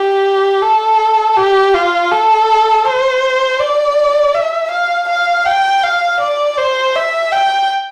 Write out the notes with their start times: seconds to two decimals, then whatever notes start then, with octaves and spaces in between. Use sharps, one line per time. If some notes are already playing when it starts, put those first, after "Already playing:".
Already playing: G4
0.62 A4
1.37 G4
1.74 F4
2.11 A4
2.85 C5
3.60 D5
4.35 E5
4.71 F5
5.08 F5
5.45 G5
5.83 F5
6.20 D5
6.57 C5
6.95 E5
7.32 G5